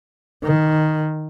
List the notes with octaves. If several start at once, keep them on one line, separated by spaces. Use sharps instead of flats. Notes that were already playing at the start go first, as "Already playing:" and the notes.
D#3